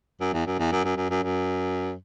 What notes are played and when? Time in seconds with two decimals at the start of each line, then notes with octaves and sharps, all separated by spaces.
0.21 F#2
0.33 E2
0.47 F#2
0.59 E2
0.72 F#2
0.85 F#2
0.97 F#2
1.10 F#2
1.23 F#2